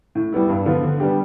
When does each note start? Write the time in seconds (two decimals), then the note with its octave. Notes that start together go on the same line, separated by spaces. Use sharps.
0.15 A2
0.32 G3 B3 E4
0.49 G2
0.66 D3 F3 B3 F4
0.83 D3
1.00 G3 B3 D4 G4